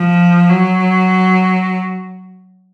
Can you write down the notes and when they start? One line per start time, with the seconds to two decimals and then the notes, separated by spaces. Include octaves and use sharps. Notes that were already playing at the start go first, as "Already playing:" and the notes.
Already playing: F3
0.50 F#3